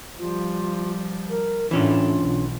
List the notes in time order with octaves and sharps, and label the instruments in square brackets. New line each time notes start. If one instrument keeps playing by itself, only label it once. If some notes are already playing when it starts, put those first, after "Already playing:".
[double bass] F3 G3 [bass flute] F4
[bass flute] A#4
[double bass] A2 [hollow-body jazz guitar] E3 C#4 D4 [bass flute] F4
[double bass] B1